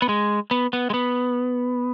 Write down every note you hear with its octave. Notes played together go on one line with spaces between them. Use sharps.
B3
G#3
B3
B3
G#3
B3